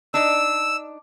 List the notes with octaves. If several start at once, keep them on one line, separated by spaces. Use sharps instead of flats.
D4 D#4 D5 E6